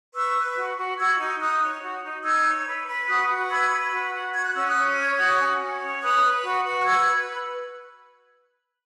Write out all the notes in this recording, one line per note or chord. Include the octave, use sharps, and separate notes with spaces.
B4 C#6 E6
B4
F#4
F#4
F#4 E6 G#6
D#4
D#4 D#6 F#6
C#5
F#4
D#4
D#4 E6 G#6
C#5
B4
B4
F#4 D#6 F#6
F#4
B4 E6 G#6
B4
F#4
F#4
F#4 G#6
F#6
C#4 E6
D#6 F#6
C#4
C#5
F#4 D#6 F#6
C#4
C#4
C#5
B4 D#6 F#6
B4
F#4
F#4
F#6
B4 E6 G#6
B4